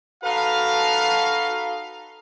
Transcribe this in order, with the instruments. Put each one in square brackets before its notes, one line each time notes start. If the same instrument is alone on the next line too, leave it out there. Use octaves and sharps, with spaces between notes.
[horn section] D#4 F#4 A4 B4 F5